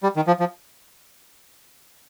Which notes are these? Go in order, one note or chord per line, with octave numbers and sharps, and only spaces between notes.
G3
D#3
F3
F3